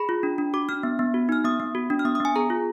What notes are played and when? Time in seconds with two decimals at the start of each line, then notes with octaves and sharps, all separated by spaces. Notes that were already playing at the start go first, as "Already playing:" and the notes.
Already playing: G#4 B5
0.09 F4
0.23 D4
0.38 D4
0.54 F#4 D6
0.69 D4 F6
0.83 B3
0.99 B3
1.14 F#4
1.29 D#4 F6
1.44 B3 D#6
1.60 B3
1.75 F#4
1.90 D4
1.99 F6
2.05 B3 D#6
2.15 D#6
2.20 B3 G#5
2.36 G#4 A#5
2.50 F4